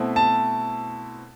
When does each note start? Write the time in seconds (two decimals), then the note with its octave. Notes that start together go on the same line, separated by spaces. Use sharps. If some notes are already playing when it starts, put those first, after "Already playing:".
Already playing: B2 A3 C4 E4
0.16 A5